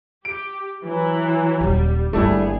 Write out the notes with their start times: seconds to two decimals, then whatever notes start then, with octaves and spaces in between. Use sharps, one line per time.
0.25 G4 D7
0.83 E3 F#3
1.61 D#1 D3 G3
2.13 G1 G3 A3 A#3 D4 E4 G#4